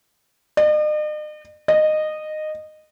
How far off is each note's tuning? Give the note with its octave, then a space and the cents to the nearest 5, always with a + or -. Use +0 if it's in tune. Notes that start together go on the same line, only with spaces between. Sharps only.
D#5 -45
D#5 -15